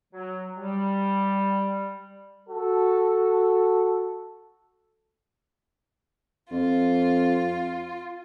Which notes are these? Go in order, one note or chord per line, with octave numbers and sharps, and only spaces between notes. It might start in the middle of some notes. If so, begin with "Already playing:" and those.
F#3
G3
F#4 A4
F2 F4